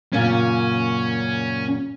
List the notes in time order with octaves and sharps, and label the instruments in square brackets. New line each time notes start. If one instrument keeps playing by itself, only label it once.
[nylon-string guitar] F#2 A#2 C#3 [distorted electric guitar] C#4